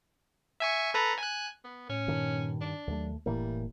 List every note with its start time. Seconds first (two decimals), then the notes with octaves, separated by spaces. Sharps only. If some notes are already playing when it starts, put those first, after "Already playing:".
0.60 E5 G#5 C#6
0.94 A4 B4 A#5
1.18 G#5 F#6
1.64 B3
1.89 A2 C#4
2.08 G2 A#2 D#3
2.61 D4
2.87 D#2 F#3 A3
3.26 F1 A2 E3 G3 A#3